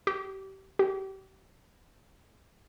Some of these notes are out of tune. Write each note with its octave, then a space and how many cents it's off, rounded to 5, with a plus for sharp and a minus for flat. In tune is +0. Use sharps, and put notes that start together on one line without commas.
G4 -30
G4 -35